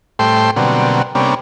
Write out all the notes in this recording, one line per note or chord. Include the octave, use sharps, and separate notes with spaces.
A2 G3 A3 C5 G5 C6
B2 D3 F#3 G3 A#3 C4
C3 G3 A#3 B3 C#4 D4